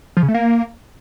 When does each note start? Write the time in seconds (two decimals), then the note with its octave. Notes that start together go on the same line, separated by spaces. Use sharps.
0.17 F3
0.23 C#3
0.28 A3
0.34 A#3